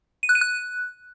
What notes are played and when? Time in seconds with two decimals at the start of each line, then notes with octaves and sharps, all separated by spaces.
0.23 D#7
0.29 F#6
0.35 D#7
0.41 F#6